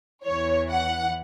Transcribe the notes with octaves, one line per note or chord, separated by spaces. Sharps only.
E2 E3 C#5
F#5